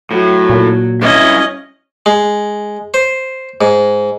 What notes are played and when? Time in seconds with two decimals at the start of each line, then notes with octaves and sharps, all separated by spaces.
0.11 A2 F#3
0.50 A#2
1.02 G2 C#4 E4 D#5
2.06 G#3
2.94 C5
3.61 G#2